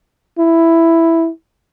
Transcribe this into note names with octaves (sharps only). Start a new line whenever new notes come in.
E4